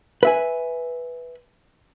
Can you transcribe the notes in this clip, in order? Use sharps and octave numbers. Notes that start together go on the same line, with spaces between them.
B4 E5 G#5